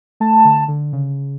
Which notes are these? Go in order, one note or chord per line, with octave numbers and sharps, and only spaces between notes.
A3 A5
D3
D3
C#3